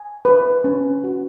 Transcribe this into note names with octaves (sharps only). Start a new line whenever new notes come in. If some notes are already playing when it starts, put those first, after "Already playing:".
Already playing: G#5
B4
C#4
F#4